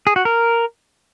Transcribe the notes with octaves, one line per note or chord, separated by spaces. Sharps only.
G#4
F#4
A#4